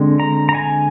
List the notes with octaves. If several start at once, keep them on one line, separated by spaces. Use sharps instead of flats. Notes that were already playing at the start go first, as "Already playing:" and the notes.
Already playing: D3 G#3 C4
A#5
A#5
G#5